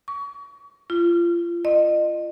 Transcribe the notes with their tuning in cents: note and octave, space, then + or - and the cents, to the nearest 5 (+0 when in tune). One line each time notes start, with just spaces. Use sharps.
C#6 +30
F4 -30
D#5 -35